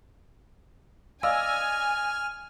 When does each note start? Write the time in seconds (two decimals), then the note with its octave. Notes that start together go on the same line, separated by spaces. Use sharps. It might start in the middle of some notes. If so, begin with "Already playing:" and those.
1.23 D5 D#5 F5 G#5 E6 F6